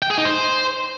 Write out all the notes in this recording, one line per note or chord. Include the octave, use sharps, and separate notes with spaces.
G5
G#4
D#4
C5